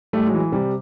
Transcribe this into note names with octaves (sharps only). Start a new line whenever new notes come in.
A2 G3 A3
F#3 G#3
E3
C3 G3